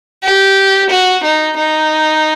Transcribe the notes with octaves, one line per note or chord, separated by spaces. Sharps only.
G4
F#4
D#4
D#4